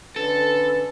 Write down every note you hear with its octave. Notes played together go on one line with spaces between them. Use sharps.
D3 C#4 A4 B4